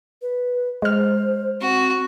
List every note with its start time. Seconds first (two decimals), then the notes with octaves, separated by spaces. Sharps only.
0.22 B4
0.82 G#3 C5 F6
1.61 C4 F#4